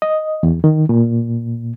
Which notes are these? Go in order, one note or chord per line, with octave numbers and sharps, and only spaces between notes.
D#5
E2
D#3
A#2